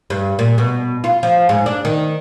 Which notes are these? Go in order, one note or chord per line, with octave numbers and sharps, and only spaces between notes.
G2
A#2
B2
F4
F3
G#2
D4
D#3